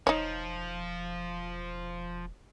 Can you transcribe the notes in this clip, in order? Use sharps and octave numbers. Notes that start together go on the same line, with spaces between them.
E1 F3 D#4 C#5